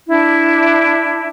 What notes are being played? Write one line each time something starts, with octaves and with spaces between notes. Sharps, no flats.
D4 E4